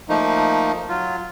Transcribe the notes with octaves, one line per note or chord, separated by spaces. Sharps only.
F3 A3 A#3 D#4
F#3 F4